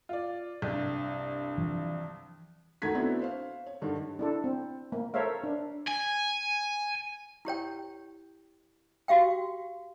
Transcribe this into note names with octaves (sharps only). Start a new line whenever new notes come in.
F4 D5
C2 G2
E3 F3
D2 D#3 A3 A#5 G#6 B6
B3 C4 D4 E4 F#4 A4
C5 F5
C#5
G2 D3 D#3
D4 E4 A4
C4
A#3
A4 A#4 C5 C#5 E5 F5
D4
G#5
E4 G4 C#5 G5
F#4 G4 F5 G5